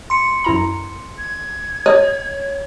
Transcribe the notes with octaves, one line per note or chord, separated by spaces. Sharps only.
C6 C#7
F#2 E4 A#5
G#6
C#5 D#5